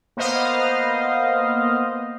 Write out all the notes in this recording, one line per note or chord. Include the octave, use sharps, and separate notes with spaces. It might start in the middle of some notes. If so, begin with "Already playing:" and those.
A#3 B3 C5 D#5 F5